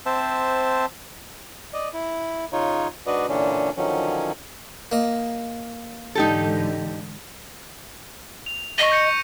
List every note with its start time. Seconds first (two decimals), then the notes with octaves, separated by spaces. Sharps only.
0.06 C4 C5 E5 A5
1.74 D5 D#5
1.93 E4
2.53 C#3 D#4 F4 C#5
3.07 G#2 D4 F#4 B4 D5 D#5
3.29 A#2 D3 E3 C#4 D4
3.77 D3 D#3 F3 F#3 C#4
4.92 A#3 D#5
6.15 G#2 D3 E3 D#4 G4 A4
8.46 F7
8.78 D#5 C#6 A#6 D#7
8.90 C#6 G6 C#7